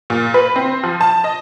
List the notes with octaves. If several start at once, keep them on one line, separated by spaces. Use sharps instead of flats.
A#2
B4
C4
F3
A5
D#5